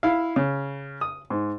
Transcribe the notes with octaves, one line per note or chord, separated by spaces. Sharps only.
E4 F5
C#3
D#6
G#2